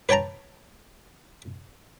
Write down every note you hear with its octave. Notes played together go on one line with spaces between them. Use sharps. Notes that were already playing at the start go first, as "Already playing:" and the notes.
B4 C#5 G5 A5 A#5